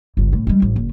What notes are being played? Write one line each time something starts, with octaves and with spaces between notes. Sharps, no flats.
G1 C#2
A2
G3 G#3
A1
F#1